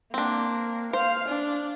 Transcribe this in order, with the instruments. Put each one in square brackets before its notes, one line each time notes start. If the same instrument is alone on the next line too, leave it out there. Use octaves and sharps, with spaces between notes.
[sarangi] A#3 [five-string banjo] C4 D4
[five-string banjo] C5 [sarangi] F5
[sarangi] D4